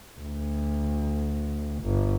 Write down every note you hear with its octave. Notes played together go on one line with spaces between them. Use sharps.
D2
G1